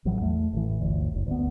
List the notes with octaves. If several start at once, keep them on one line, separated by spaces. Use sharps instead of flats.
A1 E3 F#3
E2 A3
A1 E3
G1 D2
F#1
D2 B3